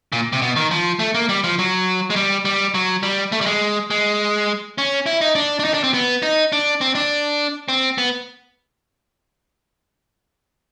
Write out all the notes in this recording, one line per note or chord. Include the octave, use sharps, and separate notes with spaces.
A#2
C3
B2
D#3
F3
A3
A#3
G3
F3
F#3
G#3
G3
G3
F#3
G3
A3
G3
G#3
G#3
C#4
E4
D#4
D4
D4
D#4
D4
C4
B3
D#4
D4
C4
D4
C4
B3